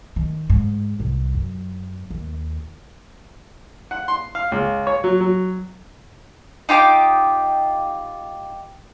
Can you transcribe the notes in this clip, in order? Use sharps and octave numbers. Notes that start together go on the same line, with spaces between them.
D#3
G#2
C2
F#2
D#2
F#5
C6
F5
C#2
C#5
F#3
F#3
D#4 F4 G4 G5